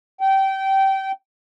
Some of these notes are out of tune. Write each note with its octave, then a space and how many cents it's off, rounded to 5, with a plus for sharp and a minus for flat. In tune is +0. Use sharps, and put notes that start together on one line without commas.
G5 -20